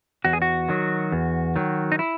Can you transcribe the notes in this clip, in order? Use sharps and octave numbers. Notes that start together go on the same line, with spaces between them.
E2 F#4
G#4
F#4
D#3 F#3
E2
D#3 F#3
D#4
E4